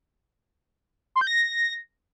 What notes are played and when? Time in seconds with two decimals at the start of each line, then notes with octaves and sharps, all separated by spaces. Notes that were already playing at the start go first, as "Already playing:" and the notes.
1.16 C6
1.21 G6
1.27 A#6